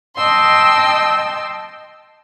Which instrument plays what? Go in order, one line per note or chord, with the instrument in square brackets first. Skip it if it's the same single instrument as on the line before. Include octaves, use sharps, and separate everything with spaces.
[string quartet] D#5 G5 A5 C6 E6